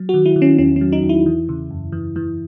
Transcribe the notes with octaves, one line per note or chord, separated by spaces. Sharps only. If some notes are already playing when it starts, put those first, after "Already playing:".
Already playing: F#3
F#4
D#3
E4
D#3
C#4
E2 C#4
C#4
F#3
D#4
E2
E4
E3
C#3
F#2
E3
E3